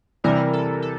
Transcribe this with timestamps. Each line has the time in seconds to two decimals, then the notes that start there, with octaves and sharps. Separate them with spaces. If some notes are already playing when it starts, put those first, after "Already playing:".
0.24 C3 E3 G3 A#4
0.53 A4
0.82 A4